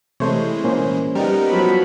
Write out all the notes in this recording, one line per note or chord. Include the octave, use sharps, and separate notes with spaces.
C3 E3 G#3 A3 C5 C#5
A#2 A#3 C#4 C5
G3 B3 D#4 A#4
F3 F#3 B5